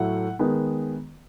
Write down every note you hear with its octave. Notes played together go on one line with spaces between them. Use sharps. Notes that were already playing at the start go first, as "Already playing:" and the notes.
Already playing: A2 F#3 A3 F#5
D#3 G#3 B3